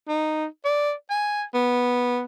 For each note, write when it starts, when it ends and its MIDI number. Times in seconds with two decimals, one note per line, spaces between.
0.08 0.45 63
0.65 0.92 74
1.10 1.43 80
1.54 2.23 59